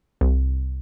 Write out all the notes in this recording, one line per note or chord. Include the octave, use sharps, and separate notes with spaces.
C2